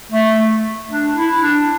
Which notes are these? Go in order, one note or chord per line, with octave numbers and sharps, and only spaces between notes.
A3
D4
E4
D4